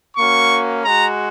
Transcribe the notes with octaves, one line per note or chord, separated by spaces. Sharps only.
A#3 C#4 F#4 C#6
G#3 F#4 A#5